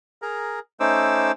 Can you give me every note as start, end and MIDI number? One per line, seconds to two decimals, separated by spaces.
0.22 0.59 68
0.22 0.59 70
0.22 0.59 82
0.80 1.32 57
0.80 1.32 61
0.80 1.32 63
0.80 1.32 72
0.80 1.32 86
0.80 1.32 88